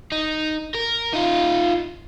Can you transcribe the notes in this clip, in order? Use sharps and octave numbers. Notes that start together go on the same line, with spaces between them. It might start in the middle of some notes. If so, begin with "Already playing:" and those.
D#4
A#4
D#4 F4